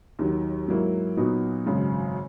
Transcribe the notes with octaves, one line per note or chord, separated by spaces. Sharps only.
D#2 D#3 F#3
G#2 F#3 A#3 E4
A#2 F#3 B3 D#4 F#4
G#1 F#2 C#3 G#3